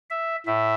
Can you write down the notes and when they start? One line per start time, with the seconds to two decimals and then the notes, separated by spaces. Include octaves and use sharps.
0.10 E5
0.46 A2 E5